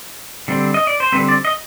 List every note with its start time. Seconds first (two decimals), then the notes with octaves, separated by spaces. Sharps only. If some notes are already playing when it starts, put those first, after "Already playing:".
0.48 D3 G3 C4
0.74 D#5
0.87 D5
1.00 C5
1.12 D3 G3 C4 B4
1.29 D5
1.45 D#5